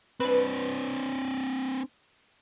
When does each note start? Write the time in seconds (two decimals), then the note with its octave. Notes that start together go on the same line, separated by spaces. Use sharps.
0.20 C4 D4 B4